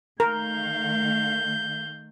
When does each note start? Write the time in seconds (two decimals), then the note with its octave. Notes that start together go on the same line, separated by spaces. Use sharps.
0.20 D#3 A3 A#4 F5 G6